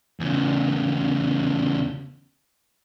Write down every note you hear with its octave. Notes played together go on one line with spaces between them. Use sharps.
E2 C#3